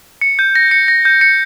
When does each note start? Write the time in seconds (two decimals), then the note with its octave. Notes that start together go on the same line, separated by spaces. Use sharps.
0.21 C#7
0.39 G6
0.55 A#6
0.71 C#7
0.88 A#6
1.05 G6
1.21 C#7